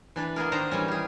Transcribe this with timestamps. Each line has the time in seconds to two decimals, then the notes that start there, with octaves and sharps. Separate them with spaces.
0.16 E3 D4 B4
0.36 A#3 B3 G#4 A#4
0.52 D#3 D4 C5 A#5
0.71 D#3 E3 G3 C#4
0.88 G4 G#4